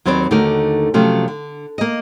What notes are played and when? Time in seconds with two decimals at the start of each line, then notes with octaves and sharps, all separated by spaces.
0.05 D#2 F#3 C4 B4 C#5 D5
0.31 D#2 D3 A3 D#4 F#4 A#4
0.94 C3 F3 F#3 A3 C#4
1.28 D3
1.78 A#3 D#5